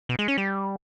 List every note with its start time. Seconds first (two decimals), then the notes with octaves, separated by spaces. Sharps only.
0.09 B2
0.19 G#3
0.28 C#4
0.38 G3